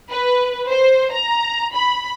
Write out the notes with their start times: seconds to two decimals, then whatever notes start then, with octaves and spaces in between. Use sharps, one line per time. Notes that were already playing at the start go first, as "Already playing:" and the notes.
0.10 B4
0.70 C5
1.12 A#5
1.74 B5